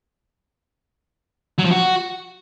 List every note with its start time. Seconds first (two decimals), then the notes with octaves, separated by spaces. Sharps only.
1.58 F#3
1.65 F3
1.71 F#4